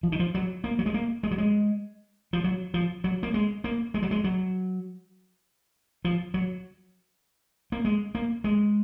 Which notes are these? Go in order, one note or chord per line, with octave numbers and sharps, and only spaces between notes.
F3
D#3
F3
F#3
A#3
F#3
G#3
A#3
G#3
F#3
G#3
F3
F#3
F3
F#3
A#3
G#3
A#3
G#3
F#3
G#3
F#3
F3
F#3
A#3
G#3
A#3
G#3